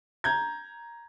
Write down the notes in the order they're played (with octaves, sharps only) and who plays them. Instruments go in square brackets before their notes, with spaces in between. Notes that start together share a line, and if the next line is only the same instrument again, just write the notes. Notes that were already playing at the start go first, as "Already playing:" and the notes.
[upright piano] A#5 G6 G#6